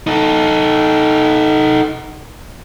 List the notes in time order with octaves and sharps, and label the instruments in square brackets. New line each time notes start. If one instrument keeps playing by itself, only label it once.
[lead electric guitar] D#4 A4